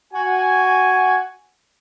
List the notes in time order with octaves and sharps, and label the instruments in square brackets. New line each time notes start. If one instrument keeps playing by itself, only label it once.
[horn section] F#4 G#5